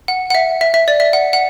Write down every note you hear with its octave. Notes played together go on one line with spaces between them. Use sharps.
F#5
F#5
E5
E5
E5
D5
E5
F#5
F#5